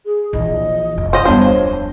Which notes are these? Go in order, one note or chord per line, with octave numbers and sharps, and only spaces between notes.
G#4
A#1 E3 D#5
F1
C5 D#5
D1 F2 G3 B3 D4 C5 C#5